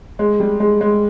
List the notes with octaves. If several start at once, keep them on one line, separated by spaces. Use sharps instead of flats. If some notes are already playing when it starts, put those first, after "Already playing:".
G#3
G3
G#3
G#3